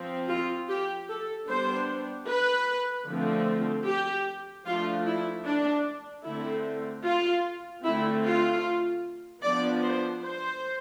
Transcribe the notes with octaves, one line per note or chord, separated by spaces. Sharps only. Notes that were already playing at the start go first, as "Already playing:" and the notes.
Already playing: F3 C4
F4
G4
A4
G3 B3 D4 C5
B4
D3 F3 A3 C4
G4
F3 A3 D4 F4
E4
D4
D3 A3 C4 E4
F4
D3 A3 C4 E4
F4
F3 B3 D4 D5
C5
C5